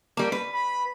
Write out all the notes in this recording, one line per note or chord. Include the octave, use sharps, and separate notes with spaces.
G3 A#3
B4
B5